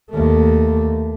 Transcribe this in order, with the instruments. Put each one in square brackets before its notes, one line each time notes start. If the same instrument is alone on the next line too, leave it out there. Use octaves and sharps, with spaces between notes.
[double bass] D#2 A3